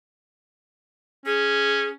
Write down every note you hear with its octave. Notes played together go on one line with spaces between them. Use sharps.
C#4 G#4